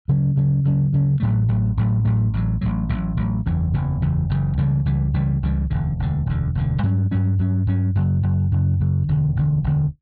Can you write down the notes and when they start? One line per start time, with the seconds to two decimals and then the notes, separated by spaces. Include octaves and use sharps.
0.08 D2 C#3 F#3 C#4
0.36 D2 C#3 F#3 C#4
0.64 D2 C#3 F#3 C#4
0.93 D2 C#3 F#3 C#4
1.20 A1 A2 F#3 A3
1.48 A1 A2 F#3 A3
1.77 A1 A2 F#3 A3
2.05 A1 A2 F#3 A3
2.33 A1 A2 F#3
2.61 A1 A2 F#3
2.89 A1 A2 F#3
3.17 A1 A2 F#3
3.46 F#1 E2 C#3 E3
3.74 F#1 E2 C#3 E3
4.02 F#1 E2 C#3 E3
4.29 F#1 E2 C#3 E3
4.58 C#2 C#3 E3 G3
4.85 C#2 C#3 E3 G3
5.14 C#2 C#3 E3 G3
5.43 C#2 C#3 E3 G3
5.70 E1 D2 D3
5.99 E1 D2 D3
6.26 E1 D2 D3
6.55 E1 D2 D3
6.83 G2 F#3 C#4
7.11 G2 F#3 C#4
7.39 G2 F#3 C#4
7.67 G2 F#3 C#4
7.95 F#2 C#3 F#3
8.23 F#2 C#3 F#3
8.51 F#2 C#3 F#3
8.80 F#2 C#3 F#3
9.08 E1 D2 D3
9.36 E1 D2 D3
9.64 E1 D2 D3